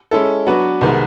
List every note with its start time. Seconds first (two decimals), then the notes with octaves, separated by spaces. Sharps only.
0.11 G#3 C#4 E4 A4
0.46 F#3 B3 D4 F#4 B4
0.81 C2 C3 D#3 G#3 B3